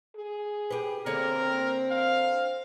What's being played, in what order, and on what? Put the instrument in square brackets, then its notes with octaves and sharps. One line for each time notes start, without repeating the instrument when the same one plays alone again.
[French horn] G#4
[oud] G4 B4
[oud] D3 A#3 C#5 [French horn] C4 [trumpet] A#4
[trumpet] F5